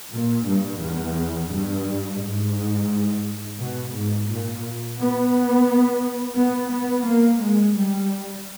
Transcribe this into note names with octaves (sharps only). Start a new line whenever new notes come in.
A#2
G2
E2
G2
G#2
B2
G#2
A#2
B3
B3
B3
A#3
G#3
G3